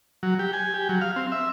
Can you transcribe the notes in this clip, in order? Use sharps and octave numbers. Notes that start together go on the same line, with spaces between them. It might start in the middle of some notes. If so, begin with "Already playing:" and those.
F#3
G4
G#5
G4
F#3
F5
C4
E5